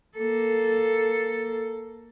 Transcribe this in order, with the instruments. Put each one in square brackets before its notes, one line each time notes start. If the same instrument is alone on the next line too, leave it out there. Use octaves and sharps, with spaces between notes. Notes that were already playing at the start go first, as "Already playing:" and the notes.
[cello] A#3 A4